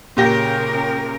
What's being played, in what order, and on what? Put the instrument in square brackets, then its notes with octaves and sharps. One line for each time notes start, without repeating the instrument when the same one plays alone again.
[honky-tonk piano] A#2 G4 A#6 [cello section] C#3 A#4